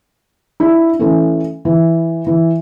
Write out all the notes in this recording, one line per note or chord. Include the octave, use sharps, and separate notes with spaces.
D4 E4
E3 A3 C#4
E3
E3